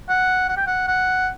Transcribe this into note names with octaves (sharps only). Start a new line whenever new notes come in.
F#5
F#5
G5
F#5
F#5